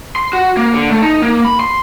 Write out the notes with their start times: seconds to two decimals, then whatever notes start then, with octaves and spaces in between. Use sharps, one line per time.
0.16 C6
0.33 F#4
0.57 A#3
0.73 D3
0.90 A3
1.02 D#4
1.22 A#3
1.45 B5
1.60 C6